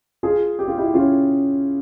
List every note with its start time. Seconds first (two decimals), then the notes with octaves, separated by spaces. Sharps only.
0.23 F4 G#4
0.59 G4
0.68 F4
0.78 E4 G4
0.94 C#4 F4